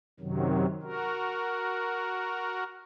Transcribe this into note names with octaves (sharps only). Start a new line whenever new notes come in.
F#2 C3 D#3 F#3
F#4 A#4